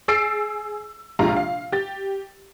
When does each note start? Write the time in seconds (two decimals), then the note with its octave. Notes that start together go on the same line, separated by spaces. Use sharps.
0.08 G#4 E6 A6 C7 D7
1.19 A#1 C3 G#3 F4 A#5
1.36 F5
1.72 G4 A6